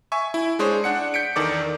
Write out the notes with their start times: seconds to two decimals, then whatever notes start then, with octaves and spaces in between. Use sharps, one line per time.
0.12 E5 G#5 C#6
0.34 E4
0.59 G#3 D4 G#4 C5 C#5
0.84 D4 F#5 C#7
1.14 G6 B6 C#7 D7
1.36 E2 D#3 A4 D5 D6